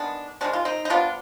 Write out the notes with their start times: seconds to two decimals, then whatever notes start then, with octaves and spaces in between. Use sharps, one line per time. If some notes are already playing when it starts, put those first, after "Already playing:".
Already playing: D#3 G#3 B3 D4
0.41 C3 D#3 G#3 D4
0.53 F4
0.65 C4 D#4
0.85 D#4
0.90 C3 G3 B3 D4 F4